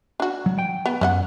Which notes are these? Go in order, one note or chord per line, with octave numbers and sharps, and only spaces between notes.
D4 F#4
F#3
G5
B3
F#2 B3 D#5 F#5